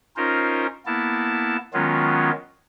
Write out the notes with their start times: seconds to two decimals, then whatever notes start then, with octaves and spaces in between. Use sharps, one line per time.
0.16 C#4 D#4 F4 A#4 C5
0.86 A#3 B3 E4 A5
1.73 D#3 F#3 G#3 B3 C#4 F4